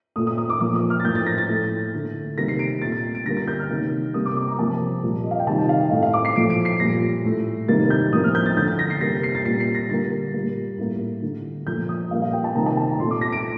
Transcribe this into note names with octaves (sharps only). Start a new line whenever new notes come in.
A#2 A3 D#6
D#6
D#6
D6
A#2 F3 A#3 D6
D#6
F6
A6
A2 F3 A#3 G6
A6
A#6
A6
A2 A3
D3 A3
C3 D#3 G3 A#3 A#6
C7
D7
A#2 A3 A6
A6
D7
D3 G3 A#3 A#6
A6
G6
F6
C3 D#3 A#3
C3 G3 A#3 D#6
D6
D6
A#5
C3 F3 A#3 A5
A#2 G3 A#3
D#5
F5
G5
C3 D#3 G3 A5
G5
F5
D#5
A2 A3 F5
F5
D6
C7
A#2 F3 A3 D7
D7
C7
A#2 G3 A#3 A#6
A2 A3
C3 D#3 G3 A#3 A6
G6
A2 F3 A#3 D#6
F6
G6
A6
D3 A3 G6
A6
A#6
C7
C3 G3 A#3 A#6
C7
A6
A#2 G3 A#3 C7
C7
A#6
D3 G3 A#3 A6
A#2 G3 A#3
A2 G3 A#3
D3 A3
A#2 F3 A3 G6
D#6
A#2 G3 A#3 F5
F5
G5
A5
C3 D#3 G3 A#3 A#5
A5
A5
A#5
A#2 A3 C6
D6
A#6
D7